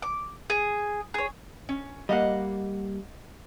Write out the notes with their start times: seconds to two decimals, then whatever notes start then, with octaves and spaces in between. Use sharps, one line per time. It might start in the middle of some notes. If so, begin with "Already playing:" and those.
0.02 D6
0.50 G#4
1.14 G#4 C#5
1.69 C#4
2.09 G3 A#3 D#5 F5 F#5